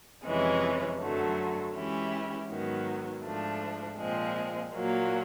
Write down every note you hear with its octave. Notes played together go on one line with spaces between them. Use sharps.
F2 C3 E3 G#3 C#4
F#2 D3 F#3 A3
E3 G#3 C#4 E4 G4
G#2 D#3 F#3 B3
G#2 F3 A3 D4
A#2 F3 G#3 C4
A#2 F#3 A#3